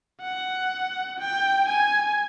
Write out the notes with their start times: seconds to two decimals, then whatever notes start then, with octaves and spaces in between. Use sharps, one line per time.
0.21 F#5
1.19 G5
1.68 G#5